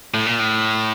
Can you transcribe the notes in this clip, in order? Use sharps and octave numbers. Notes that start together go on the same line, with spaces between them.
A2
A#2
A2